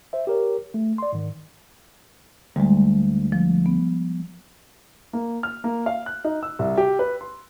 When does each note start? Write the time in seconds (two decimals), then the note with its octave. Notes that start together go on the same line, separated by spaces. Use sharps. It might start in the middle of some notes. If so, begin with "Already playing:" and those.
0.13 C5 E5
0.27 G4 A#4 C#5
0.74 A3
0.98 D5 C6
1.13 G#2 D#3
2.56 D2 G3 G#3
3.32 F3
3.66 B3
5.13 A#3
5.43 F6
5.64 A#3
5.86 F5
6.06 F#6
6.25 D#4
6.43 E6
6.59 C2
6.78 G4
6.99 B4
7.21 C6